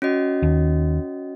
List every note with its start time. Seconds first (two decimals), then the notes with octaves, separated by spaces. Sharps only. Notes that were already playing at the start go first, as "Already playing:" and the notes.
0.02 C#4 F#4 D#5
0.43 D#2